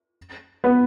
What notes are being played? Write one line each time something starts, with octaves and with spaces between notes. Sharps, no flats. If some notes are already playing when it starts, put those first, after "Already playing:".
B3